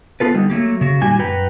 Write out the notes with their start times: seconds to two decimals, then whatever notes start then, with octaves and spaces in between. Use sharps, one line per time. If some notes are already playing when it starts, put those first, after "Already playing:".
0.20 B3 F4 A4 B4
0.34 D3 G3 D#4
0.50 F#3 A3 A#3 G4
0.81 C#3 F#4
1.02 A#2 D#3 G3 F#4 G4 G#5
1.19 F#2 F#4 B4 G5 A#5